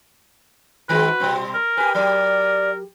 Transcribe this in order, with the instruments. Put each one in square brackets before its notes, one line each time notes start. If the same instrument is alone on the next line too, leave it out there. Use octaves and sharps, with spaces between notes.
[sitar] D#3 G#3 C4 [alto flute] F#4 [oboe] B4
[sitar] B2 G3 C4
[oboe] A#4
[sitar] G4 B4 [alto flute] G#5
[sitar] F#3 G4 [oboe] A#4 [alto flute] D5